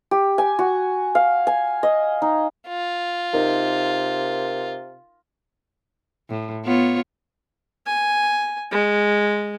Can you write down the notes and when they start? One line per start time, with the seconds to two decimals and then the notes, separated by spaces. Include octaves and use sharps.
0.11 G4
0.38 G#5
0.59 F#4
1.15 F5
1.47 G#5
1.83 D#5
2.22 D#4
2.68 F4
3.33 C3 D#4 A#4
6.30 A2
6.65 B3 F4 C#5
7.86 G#5
8.71 G#3